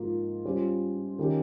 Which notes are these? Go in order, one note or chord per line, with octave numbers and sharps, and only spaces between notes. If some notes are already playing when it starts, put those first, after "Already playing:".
Already playing: G#2 F3 A#3 F4
G3 C#4 F4 C5
D#3 A#3 C#4 G4